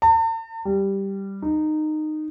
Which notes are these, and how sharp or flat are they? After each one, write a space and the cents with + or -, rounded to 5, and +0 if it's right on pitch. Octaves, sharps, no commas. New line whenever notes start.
A5 +45
G3 +0
D#4 -15